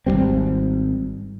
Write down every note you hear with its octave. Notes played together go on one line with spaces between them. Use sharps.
G#1 E2 G3 C4